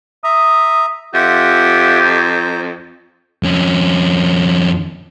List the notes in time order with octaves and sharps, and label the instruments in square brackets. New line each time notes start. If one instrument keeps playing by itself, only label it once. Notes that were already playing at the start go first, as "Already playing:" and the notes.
[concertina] E5 A#5 [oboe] D#6
[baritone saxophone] F2 [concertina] F4 E5 F#5 [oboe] G4
[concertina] C5 A#5
[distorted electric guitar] F2 C#4